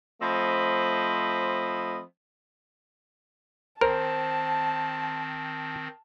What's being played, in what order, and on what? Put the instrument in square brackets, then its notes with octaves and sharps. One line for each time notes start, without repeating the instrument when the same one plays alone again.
[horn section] F3 A3 C4 D#5 B5
[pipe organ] D#3 C4 [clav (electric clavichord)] A#4 [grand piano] C5 [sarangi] A5